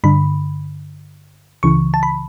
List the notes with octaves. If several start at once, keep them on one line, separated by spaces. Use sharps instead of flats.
G2 D3 B5
C#2 C#3 E3 C#6
A5
B5